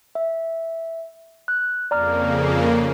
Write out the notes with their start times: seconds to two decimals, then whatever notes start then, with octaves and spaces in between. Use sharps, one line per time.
0.15 E5
1.48 F#6
1.91 F2 C#3 A#3 D5 A#5 F6